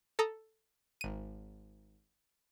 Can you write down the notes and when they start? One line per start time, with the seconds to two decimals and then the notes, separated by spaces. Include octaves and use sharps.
0.19 A4 A#5 D#6
1.01 G#1 D#7